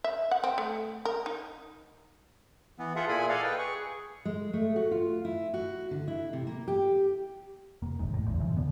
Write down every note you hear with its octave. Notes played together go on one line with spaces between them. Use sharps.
E5
F#5
C4
A3
A#4
D#4
E3 B3
F4 G#4 A4 E5 F#5
A#2 E4 G#4 G#5 B5
A4 D5 D#5 F5 F#5 G#5
B4 G5
G#4 C#6
G#3
A3
F#4
F4
E4
F#4
D3
E4
C3
A#3
G4
F1 A#3
F1 A#1 D#2 G#2
A2
A#1 E2 G#2 D3
F#2 C#3 E3 F3
D#2 D3 B3